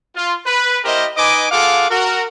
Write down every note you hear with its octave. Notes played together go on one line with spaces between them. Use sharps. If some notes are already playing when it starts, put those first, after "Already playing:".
F4
B4
A#3 E4 G4 A#4 C5 D#5
D#4 B4 D#5 G#5 D6
F4 G#4 A4 F5 F#5 D6
F#4 A#4